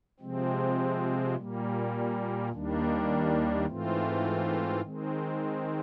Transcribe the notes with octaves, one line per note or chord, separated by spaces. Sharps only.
C3 F3 G#3 C4
A#2 G3 A#3
D#2 D#3 G3 A#3 D4
G#2 E3 A3 C4 F4
D#3 G#3 C4